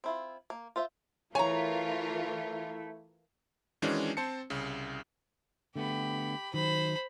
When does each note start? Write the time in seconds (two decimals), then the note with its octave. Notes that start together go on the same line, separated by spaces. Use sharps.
0.04 C4 E4 F4
0.50 A#3
0.76 F4 C5 E5
1.35 E3 A3 E4 F4 A#4 C#5 G#5 A#5
3.82 D#3 E3 G#3 C#4 D4 F#4
4.17 C4 C5 A5 C#7
4.50 C2 C#3
5.76 D3 A3 B3 G4 B5
6.54 D#3 F#3 C5 B5